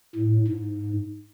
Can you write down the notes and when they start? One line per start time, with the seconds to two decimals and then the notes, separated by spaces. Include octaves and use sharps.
0.15 A2
0.48 G#2